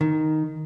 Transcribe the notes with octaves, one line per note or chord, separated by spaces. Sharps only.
D#3